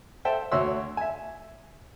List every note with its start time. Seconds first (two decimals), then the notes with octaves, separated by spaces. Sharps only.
0.25 A4 C5 E5 G5 A5
0.52 D2 F#4 C#5 E5 C6 E6
0.97 E5 G#5